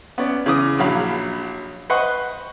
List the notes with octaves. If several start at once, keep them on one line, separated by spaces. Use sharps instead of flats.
B3 C#4 D5
C#3 E3 D6 D#6
A#1 F#3 F5 B5
B4 C5 D#5 F#5 C6 C#6